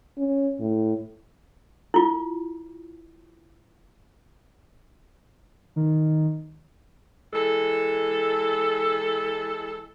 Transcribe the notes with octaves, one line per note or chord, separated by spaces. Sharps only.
C#4
A2
E4 F4
D#3
E3 G#3 A4